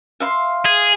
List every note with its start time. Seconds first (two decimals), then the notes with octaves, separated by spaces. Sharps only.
0.20 E5 F5 C6
0.65 G#4